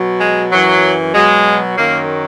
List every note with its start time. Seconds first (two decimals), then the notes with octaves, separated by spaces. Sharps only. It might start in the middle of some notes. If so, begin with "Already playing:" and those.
Already playing: B2 F#3
0.21 G#3
0.51 F#2 E3 F#3
1.15 B2 F#3 G#3
1.77 F#2 D#3 F#3 A#3